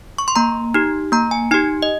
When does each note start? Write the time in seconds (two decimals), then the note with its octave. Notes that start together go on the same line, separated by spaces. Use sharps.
0.18 C#6
0.28 C6
0.36 A#3 A#5
0.74 D#4 G4
1.12 A#3 A#5
1.31 G#5
1.51 D#4 G4 G#5
1.82 D#5